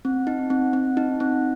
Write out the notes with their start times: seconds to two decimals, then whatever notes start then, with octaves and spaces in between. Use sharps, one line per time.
0.05 C4
0.27 D#4
0.50 C4
0.73 C4
0.97 D#4
1.20 C4